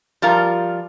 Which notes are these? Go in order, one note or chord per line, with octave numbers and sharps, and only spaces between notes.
F3 G3 F4 A#4